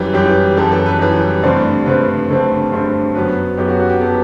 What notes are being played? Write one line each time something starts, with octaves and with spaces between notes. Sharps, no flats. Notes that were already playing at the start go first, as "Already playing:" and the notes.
Already playing: F#2 E3 G3 G4
F#2 E3 G3 G4
F#2 E3 G3 A4
A4
B4
F#2 E3 G3
G2 D3 A3 C4 D5
G2 D3 A3 C4 B4
G2 D3 A3 C4
G2 D3 A3 C4
F#2 F#3 B3 B4
F#2 F#3 B3 G4
F#4
F#4
G4
F#3 B3 A4